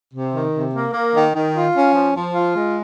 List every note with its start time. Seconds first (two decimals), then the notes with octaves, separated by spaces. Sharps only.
0.13 C3
0.34 D#3
0.54 C3
0.74 A#3
0.94 A#3
1.14 D#3
1.34 D#3
1.55 F4
1.75 C#4
1.94 F3
2.16 F3
2.35 F4
2.55 G#3